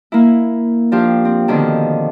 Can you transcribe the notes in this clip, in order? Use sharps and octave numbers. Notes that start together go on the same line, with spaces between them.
A#3 E4
F3 D4 F4 G4
C4
B2 D3 D#3 F3 C4